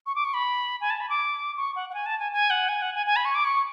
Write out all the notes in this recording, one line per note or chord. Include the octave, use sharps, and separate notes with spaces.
C#6
D6
C#6
B5
G#5
A5
B5
D6
C#6
F#5
F#5
G#5
A5
G#5
G#5
F#5
G#5
F#5
G#5
G#5
B5
C#6
D6
C#6